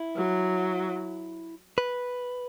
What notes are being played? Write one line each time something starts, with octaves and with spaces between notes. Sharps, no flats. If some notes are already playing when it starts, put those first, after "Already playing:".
Already playing: E4
F#3
B4